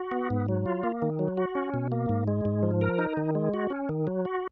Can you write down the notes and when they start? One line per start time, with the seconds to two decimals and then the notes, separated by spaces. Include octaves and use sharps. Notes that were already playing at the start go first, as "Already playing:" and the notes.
Already playing: F#4
0.11 B3
0.30 G#2
0.48 F#3
0.66 F4
0.83 A#3
1.02 D#3
1.19 F#3
1.37 F#4
1.55 C#4
1.74 B2
1.92 A#3
2.09 G#2
2.28 G#3
2.45 G#2
2.63 F3
2.81 A#4
2.99 D#4
3.17 D#3
3.35 G#3
3.54 F#4
3.70 C#4
3.89 D#3
4.07 F#3
4.25 F#4